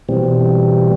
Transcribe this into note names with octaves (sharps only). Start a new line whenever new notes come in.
B2 E3 G3 C4